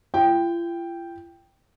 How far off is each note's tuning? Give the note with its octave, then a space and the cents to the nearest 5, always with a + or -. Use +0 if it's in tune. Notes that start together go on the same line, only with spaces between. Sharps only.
F4 -45 G5 +0